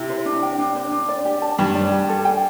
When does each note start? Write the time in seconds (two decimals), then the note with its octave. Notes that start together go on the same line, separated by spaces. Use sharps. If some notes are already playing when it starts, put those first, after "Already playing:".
Already playing: C3 E4
0.09 C5
0.26 D4
0.43 G5
0.59 D4
0.76 C5
0.92 D4
1.08 D5
1.25 G4
1.42 A5
1.59 G2 G4
1.75 D5
1.92 G4
2.09 A4
2.25 G5